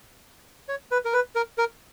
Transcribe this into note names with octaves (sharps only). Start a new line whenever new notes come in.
C#5
B4
A#4
B4
A#4
A#4